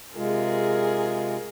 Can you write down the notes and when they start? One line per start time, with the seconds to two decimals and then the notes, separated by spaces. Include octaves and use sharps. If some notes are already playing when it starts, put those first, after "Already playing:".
0.16 C3 G#3 F4 G#4 A#4